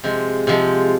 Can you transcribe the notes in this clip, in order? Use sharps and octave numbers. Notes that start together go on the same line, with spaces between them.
C3 F3 G#3
C3 F3 G#3